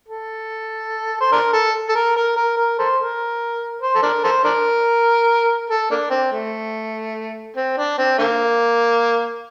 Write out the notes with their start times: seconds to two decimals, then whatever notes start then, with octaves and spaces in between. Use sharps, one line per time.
0.08 A4
1.21 C5
1.32 D4 A#4
1.53 A4
1.89 A4
1.95 A#4
2.16 A#4
2.36 A#4
2.57 A#4
2.79 A4 C5
2.99 A#4
3.82 C5
3.95 A4
4.02 D4 A#4
4.24 A4 C5
4.44 D4 A#4
5.70 A4
5.91 A#3 D4
6.10 C4
6.32 A3
7.56 C4
7.77 D4
7.98 C4
8.18 D3 A#3